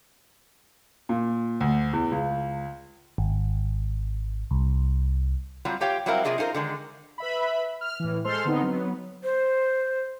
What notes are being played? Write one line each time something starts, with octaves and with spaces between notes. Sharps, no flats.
A#2
D2
E2
C#2
G#1
C2
F#3 G3 C4 F4
F4 G4 C#5 F5 G5
F#3 G3 C4 E4 A#4 F5
C3 G3 F4 G#4 D5 D#5
D#4 F4 G4 A#4 C5
D3 D#3 G#3
B4 E5 B5
F6
A2 E3
G#3 A4 C5 C6 F6
D3 B3 C4 D#4
F#3 B3
C5